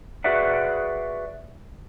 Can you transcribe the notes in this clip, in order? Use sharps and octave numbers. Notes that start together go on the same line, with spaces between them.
F#4 G#4 B4 D5 E5 F#5